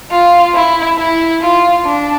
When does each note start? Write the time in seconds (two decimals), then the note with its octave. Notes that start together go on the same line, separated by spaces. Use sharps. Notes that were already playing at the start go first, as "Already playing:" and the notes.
0.11 F4
0.54 E4
0.98 E4
1.41 F4
1.85 D4